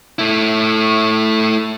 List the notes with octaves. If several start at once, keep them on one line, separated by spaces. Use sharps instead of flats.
A3 E4